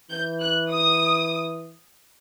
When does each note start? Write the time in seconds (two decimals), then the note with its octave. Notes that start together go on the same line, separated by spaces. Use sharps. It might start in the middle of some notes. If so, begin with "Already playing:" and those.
0.10 E3 G6
0.41 F#6
0.71 D#6